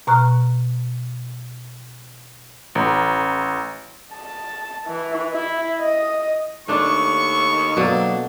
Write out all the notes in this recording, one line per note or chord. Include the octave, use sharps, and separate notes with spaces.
B2 A#5 C#6 F6 F#6
A1
A5
E3
E4
D#5
D#2 A3 D4 C#6
B2 F#3 A#3 B3 D4 A4